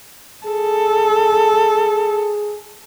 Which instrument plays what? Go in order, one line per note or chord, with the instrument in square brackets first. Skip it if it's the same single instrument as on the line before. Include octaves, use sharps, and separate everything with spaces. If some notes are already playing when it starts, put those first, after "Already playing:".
[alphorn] G#4 [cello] A4